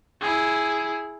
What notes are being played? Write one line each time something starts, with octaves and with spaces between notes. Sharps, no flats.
E4 G#4